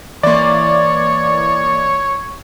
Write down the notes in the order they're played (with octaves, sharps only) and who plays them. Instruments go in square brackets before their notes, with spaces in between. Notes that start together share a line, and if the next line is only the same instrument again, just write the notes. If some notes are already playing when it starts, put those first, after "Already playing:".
[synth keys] E3 A#3 [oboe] C#5 [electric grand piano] D5 C6